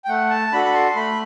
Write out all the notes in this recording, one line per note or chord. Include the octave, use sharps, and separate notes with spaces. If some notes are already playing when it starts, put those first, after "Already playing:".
G5
A3 F#5
A5
D4 F#4 A4 B5
B5
C6
A3 B5